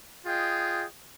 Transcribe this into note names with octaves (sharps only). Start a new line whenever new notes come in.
F4 G#4 D#5 G5